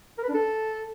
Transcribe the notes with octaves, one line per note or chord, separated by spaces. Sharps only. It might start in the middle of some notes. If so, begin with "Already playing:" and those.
A#4
B4
D4
A4